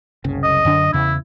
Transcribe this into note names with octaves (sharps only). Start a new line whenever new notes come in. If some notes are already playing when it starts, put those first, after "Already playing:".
F#1 C2 C#3
D#5
F#2 D3 D4
E2 C#3 E4